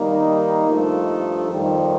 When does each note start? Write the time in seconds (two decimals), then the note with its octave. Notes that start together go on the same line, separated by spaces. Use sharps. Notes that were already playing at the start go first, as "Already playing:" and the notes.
Already playing: D#3 G3 A#3 D#4
0.68 G2 F3 A3 D#4 A4
1.51 F2 D#3 G3